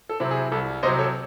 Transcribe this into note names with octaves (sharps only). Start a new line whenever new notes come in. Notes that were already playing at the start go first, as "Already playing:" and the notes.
A4
C3 F#3 C4 E4
G#4
C2 A4
C3 F#3 C5 D#5
A4 C#5